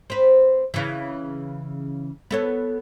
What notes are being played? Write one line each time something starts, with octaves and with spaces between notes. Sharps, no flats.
C4 B4
C#3 E3
B3 A4 C#5